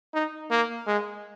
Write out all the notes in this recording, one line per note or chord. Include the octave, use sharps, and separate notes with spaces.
D#4
A#3
G#3